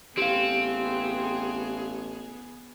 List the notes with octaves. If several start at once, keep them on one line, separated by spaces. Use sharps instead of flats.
A1 B3 C4 G4 G#4 F5